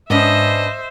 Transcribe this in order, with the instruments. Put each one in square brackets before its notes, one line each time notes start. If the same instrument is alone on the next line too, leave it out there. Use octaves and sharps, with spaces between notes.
[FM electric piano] G#2 [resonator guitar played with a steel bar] B3 C#4 D4 [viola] C5 E5 [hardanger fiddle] D#5